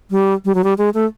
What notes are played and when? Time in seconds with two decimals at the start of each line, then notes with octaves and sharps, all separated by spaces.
0.11 G3
0.45 G3
0.55 F#3
0.64 G3
0.78 G#3
0.94 A3